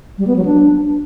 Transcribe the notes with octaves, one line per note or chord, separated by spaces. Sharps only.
G3
B3
F#3
D4